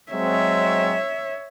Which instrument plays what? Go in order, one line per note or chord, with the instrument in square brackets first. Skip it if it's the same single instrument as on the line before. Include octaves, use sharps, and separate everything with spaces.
[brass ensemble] F#3 G#3 C4 [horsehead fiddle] C#5 [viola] E5